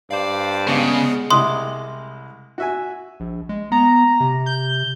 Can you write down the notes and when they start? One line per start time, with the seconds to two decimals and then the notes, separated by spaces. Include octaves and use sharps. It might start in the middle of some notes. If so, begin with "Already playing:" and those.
0.11 G2 C5 D5 F5
0.67 C#3 G#3 B3 G#4
1.31 C2 C3 G#3 C6 D#6
2.58 F#4 E5 G#5
3.20 A#1
3.49 G#3
3.72 B3 A#5
4.20 C3
4.46 G6